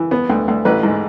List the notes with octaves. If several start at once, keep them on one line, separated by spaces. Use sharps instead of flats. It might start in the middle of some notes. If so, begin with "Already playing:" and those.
Already playing: E3
B3
D2
D2
A1 B4
G#2